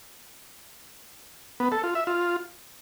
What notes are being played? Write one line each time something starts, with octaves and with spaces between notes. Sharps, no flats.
B3
A4
F4
E5
F4